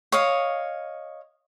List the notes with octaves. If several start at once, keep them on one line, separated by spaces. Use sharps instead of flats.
C#5 D#5 F5